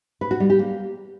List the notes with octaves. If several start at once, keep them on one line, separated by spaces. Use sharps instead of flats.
B4
F#4
G3
G4
A#3